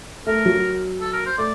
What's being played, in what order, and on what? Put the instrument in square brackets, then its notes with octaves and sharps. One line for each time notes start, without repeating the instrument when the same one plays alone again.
[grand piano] A3 [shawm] A#4
[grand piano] F#3
[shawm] A4
A#4
C5
[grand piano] A3 [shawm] D5